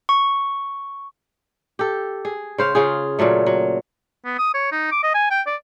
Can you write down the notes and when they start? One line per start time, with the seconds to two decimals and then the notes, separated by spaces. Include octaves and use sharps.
0.09 C#6
1.79 G4 A4
2.25 G#4
2.58 C#3 C5 F5
2.75 C#3 F4 G#4
3.19 A#2 C#3 F#3 A3
3.46 F#3
4.25 B3
4.38 D#6
4.54 C#5
4.72 D#4
4.92 D6
5.03 D#5
5.14 G#5
5.31 G5
5.46 D5